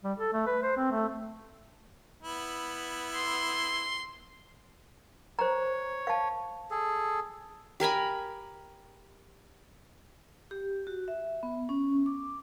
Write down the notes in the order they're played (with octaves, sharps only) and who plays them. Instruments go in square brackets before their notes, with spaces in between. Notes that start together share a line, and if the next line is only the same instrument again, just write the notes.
[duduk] G3
A4
A3
B4
C5
C4
A3
[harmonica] B3 E4
[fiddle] C6
[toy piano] C5 A#5 [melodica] C#5
[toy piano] F5 A5
[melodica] G#4 A4
[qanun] G4 A#4 G#5 B5
[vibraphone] G4
F#4
E5
B3
C#4
D6